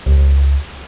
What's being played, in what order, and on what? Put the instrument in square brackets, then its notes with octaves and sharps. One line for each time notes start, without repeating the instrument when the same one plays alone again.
[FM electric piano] C#2